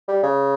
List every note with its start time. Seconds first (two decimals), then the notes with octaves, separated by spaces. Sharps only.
0.08 G3
0.23 C#3